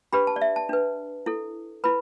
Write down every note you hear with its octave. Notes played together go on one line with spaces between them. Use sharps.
D4 G4 B4 B5
A5
D5
E5
A5
D4 B4
E4 A4
E4 B4 B5